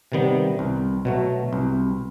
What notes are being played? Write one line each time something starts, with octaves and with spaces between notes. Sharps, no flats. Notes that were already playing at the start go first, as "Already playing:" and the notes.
C3 D#3 G3 B3
C2
B2 F#3 A3
C2